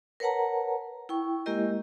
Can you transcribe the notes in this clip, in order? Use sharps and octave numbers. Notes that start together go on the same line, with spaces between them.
A#4 B4 C#5 F#5 A5 A#5
E4 G5 C#6
G#3 A#3 E4 G4 A#4 D#5